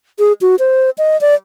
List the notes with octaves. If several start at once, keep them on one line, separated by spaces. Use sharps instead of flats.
G#4
F#4
C5
D#5
D5